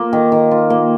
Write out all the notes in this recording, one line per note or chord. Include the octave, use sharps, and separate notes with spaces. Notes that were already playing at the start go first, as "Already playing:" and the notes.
Already playing: A#3 F4
D#3
D#3
F4
A#3